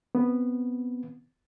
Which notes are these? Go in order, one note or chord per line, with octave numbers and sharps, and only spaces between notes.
B3 C4